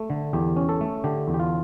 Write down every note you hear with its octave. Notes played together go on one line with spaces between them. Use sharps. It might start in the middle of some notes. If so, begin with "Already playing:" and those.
Already playing: A3
D3
E2 G4
C#4
A4
A3
D3 G4
E2
G4
F4